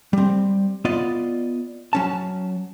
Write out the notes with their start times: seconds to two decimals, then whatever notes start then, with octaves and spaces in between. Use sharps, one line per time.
0.13 G3 C4
0.85 B3 F4 D5 D#5
1.93 F#3 C#4 A5